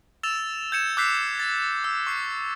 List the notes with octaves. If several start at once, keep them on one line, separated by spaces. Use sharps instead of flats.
E6 A6 E7 F7
G6 G#6 C#7 E7
D6 E6 F#6 G6 B6 C7
A6
E6
C#6 C7